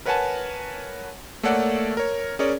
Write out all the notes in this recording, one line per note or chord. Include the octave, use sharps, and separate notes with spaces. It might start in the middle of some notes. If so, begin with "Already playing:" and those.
A#4 B4 C#5 F#5 G#5 A5
A3 A#3 A4 C#5 D5 F#5
A#4 C#5
C#4 G#4 A#4 C#5 D5